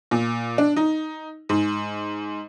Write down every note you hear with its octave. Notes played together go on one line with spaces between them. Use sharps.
A#2
D4
D#4
G#2